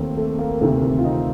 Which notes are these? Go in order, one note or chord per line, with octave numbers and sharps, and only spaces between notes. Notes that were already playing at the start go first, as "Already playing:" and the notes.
Already playing: D#2 D#3 A3 C4
A3
A#3
D2 C3 D#3 A3 C4
F4
C4 D#4